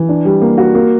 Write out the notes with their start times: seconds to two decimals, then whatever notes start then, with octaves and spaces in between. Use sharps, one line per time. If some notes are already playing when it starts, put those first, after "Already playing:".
Already playing: E3
0.09 D4
0.25 G3
0.41 A#3
0.58 F#4
0.75 A#3